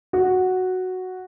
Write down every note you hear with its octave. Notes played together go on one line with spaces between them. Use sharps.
F#4